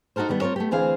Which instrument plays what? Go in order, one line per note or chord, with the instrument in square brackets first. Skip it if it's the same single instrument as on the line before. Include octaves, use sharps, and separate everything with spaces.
[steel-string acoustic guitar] D#4 F#4 A4 A#4 C5
D#3 G3 B3
C4 F4 A#4 C#5
A3 B3 G4
D2 E3 C4 G#4 C5 F5